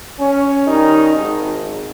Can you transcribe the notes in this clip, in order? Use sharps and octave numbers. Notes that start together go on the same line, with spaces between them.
C#4
D#3 G3 C#4 D#4
G#1